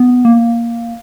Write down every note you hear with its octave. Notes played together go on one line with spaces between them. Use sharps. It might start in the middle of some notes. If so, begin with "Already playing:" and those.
Already playing: B3
A#3